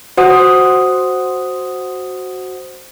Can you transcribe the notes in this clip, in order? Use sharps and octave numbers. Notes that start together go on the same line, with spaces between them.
F#4 C5 F#5 D#6